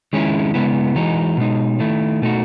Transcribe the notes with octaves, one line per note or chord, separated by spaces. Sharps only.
D#3 G#3 C#4 E4
C#3 G#3 B3 E4
E3 G#3 D#4 F#4
B2 G#3 D#4
D#3 A3 E4
B2 A3 D#4 F#4